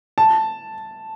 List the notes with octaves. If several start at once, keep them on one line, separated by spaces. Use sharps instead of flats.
A5